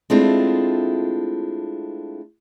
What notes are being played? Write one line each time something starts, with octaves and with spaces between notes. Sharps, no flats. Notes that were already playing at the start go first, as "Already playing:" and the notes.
G#3 A3 C4 D4 E4 F4